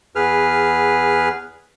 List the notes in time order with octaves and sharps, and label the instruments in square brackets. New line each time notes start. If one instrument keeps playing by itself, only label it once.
[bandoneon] E2 G#4 B4 F6